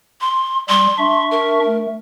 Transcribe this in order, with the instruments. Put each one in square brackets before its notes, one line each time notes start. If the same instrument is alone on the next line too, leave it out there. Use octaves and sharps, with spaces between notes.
[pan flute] C6
[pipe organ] G3 [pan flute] C6
[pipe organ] D4 E5 C#6
[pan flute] A#4
[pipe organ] A3